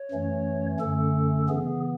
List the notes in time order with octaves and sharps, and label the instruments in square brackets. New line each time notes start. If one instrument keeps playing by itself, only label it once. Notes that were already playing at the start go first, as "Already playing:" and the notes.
Already playing: [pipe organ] C#5
F#2 E3 A3 C#4
F#2 D3 A3 C#4 A4
C#3 E3 B3 G#4